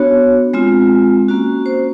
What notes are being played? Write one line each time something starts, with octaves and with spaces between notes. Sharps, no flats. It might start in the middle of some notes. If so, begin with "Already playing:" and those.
Already playing: B3 D4 F#4 C#5
G#3 C4 F4
A#3 C#4 F#4
C5